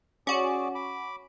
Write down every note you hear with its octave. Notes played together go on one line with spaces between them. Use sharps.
C#4 F#4 G#4 D5 D6
B5 D6